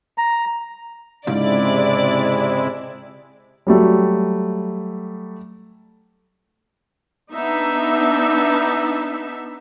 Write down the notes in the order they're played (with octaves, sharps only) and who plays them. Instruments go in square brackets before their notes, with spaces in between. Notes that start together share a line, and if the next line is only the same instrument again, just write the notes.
[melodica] A#5
[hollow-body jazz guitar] C#2 G#2 [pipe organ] C3 G#3 E4 [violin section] D5
[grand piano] F#3 G3 A3
[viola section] B3 D4 D#4 E5